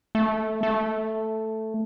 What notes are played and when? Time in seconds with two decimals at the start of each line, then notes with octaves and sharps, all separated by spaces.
0.15 A3
0.63 A3